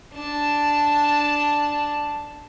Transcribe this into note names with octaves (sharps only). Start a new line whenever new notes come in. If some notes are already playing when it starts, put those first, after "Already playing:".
D4 A5